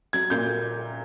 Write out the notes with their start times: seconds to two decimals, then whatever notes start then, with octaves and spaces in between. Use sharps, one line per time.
0.13 F#3 G#6
0.30 A#2 G6